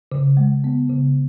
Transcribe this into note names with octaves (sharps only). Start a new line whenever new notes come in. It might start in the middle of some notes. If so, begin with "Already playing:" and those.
C#3
G#3
B3
C#3